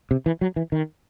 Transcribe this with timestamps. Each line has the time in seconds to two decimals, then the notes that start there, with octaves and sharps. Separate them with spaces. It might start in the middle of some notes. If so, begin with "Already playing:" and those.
0.11 C3
0.26 E3
0.41 F#3
0.56 E3
0.72 D#3